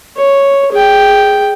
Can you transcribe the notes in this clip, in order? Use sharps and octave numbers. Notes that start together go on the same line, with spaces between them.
C#5
G#4 G5